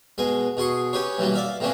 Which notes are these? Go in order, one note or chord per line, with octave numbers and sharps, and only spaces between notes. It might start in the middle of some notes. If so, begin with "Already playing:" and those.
B2 G#3 G#5
B2 G#4 C6 C#6
C#4 G4 B4 C#5
B1 E3 F#3 G3 A#3
D5 E5 F5
A2 C3 E3 A#3 C#4 D4